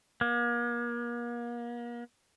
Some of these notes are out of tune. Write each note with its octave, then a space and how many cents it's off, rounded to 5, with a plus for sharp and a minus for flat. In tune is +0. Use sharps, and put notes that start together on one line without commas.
A#3 +40